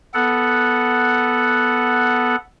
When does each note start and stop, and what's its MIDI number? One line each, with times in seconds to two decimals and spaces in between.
0.14 2.36 59
0.14 2.36 69
0.14 2.36 78